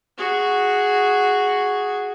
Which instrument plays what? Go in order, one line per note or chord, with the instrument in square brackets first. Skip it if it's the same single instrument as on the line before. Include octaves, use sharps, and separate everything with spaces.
[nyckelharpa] F#4 G#4